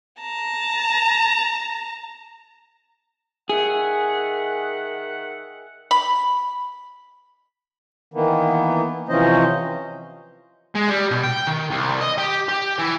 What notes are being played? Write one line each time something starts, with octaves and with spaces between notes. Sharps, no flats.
A5 A#5
D#3 G#4 E5 F#5
B5
D#3 E3 A#3 B3
C3 E3 F3 C#4 C5 D#5
G#3
G3
B2
G5
D#3
C2
D#5
G4
G4
E3